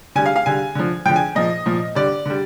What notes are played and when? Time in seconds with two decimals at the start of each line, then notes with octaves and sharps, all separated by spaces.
0.15 D3 G3 G#5
0.26 F5
0.36 F5
0.46 D3 G3 G#5
0.75 D3 F3
1.05 D3 F3 G5
1.16 G#5
1.35 A#2 F3 D#5
1.66 A#2 F3
1.95 D3 G3 D5
2.26 D3 G3